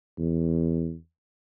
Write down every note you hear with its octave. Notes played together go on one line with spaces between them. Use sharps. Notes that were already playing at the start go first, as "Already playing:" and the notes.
E2